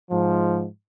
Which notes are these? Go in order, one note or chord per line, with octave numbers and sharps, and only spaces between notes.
G#2 F3